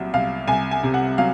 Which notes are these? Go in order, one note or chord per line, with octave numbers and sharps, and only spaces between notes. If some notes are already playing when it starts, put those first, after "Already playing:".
Already playing: C2 A#2 F#3
C2 F5
C2 G#5
G#5
C3
F#5
F#3 F5